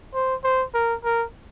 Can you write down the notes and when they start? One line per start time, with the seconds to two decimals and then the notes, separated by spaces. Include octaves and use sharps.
0.14 C5
0.44 C5
0.74 A#4
1.04 A#4